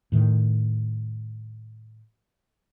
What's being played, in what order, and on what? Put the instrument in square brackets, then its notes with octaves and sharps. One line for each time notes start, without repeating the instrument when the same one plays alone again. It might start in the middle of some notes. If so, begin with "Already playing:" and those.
[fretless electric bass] A2 D#3